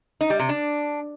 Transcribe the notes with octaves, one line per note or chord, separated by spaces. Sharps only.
D#4
G3
C3
D4